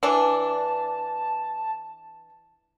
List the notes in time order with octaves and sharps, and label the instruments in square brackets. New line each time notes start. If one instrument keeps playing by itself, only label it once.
[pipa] E3 D4 [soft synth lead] A5